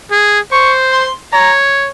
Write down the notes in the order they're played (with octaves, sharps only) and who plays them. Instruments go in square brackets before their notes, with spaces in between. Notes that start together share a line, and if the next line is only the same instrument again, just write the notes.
[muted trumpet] G#4
[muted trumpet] C5 [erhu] C#6
[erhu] C6
[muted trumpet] C#5 [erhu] A#5